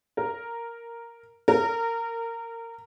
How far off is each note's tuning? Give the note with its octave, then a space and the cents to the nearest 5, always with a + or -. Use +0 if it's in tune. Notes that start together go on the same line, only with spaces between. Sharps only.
A#4 -5
A#4 -20